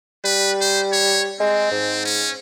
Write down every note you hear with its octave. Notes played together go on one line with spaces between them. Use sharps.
G3 B4
C5
C#5
G#3 C4
G#2
C#4